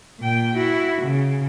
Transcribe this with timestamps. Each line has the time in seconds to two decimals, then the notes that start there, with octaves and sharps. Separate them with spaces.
0.19 A#2 G5
0.56 E4 F#4
1.02 C#3